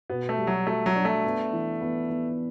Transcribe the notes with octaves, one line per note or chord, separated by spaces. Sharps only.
B2 B3
A3
G3
F#3
A3 F#4
F#3
D4
A3
B3
E3
B3
B3